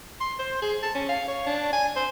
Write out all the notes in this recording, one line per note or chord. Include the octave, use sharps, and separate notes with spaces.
C6
C5
G#4
A5
C#4
F5
C#5
D4
G#5
C5